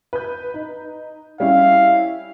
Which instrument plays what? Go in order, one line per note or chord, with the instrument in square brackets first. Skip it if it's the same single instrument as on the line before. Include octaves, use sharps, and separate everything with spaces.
[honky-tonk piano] B4 G6
D#4
[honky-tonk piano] G3 C#4 E4 [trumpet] F5